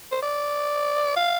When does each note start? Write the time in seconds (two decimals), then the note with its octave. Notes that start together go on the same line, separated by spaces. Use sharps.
0.12 C5
0.22 D5
1.16 F5